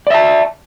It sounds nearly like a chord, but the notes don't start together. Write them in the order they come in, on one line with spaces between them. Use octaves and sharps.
D5 E5 A5